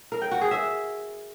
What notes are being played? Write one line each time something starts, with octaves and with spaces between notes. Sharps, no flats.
A#4
G5
F#4
G#4
E5